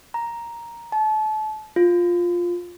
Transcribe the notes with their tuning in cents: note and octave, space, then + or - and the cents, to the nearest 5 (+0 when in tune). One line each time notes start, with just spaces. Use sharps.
A#5 +5
A5 -30
F4 +5